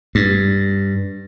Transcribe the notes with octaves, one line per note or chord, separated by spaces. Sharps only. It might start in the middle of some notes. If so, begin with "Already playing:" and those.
G2